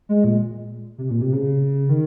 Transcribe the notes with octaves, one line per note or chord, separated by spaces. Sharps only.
G#3
A#2
C3
A#2
C3
C#3
D#3